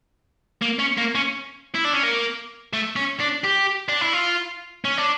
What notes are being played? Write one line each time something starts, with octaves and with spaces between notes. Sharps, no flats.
A#3
C#4
A#3
C#4
E4
D4
C#4
A#3
A3
C#4
D4
G4
D4
E4
F4
C#4
D4